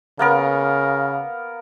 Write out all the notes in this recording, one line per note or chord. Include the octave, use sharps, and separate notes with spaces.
C#3 A#3 B3 A#4